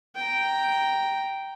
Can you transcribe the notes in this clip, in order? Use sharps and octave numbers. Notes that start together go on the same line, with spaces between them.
G5 A#5